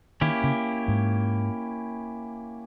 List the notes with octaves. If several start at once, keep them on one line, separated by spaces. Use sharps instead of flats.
D#3 A#3 C#4 E4 G4
C#3
G#2